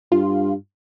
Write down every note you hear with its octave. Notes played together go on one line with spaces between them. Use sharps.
G2 F4